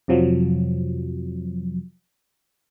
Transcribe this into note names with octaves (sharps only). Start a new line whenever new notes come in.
F2 C3 F3 F#3